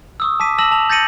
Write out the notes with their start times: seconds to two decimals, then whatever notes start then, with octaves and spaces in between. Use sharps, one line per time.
0.20 C#6 D#6 E6
0.40 A5 D6 B6 D#7
0.58 A5 E6 A#6 D#7 E7 F#7
0.71 A5 F7
0.90 G6 A6 A#6 C#7 D#7 F#7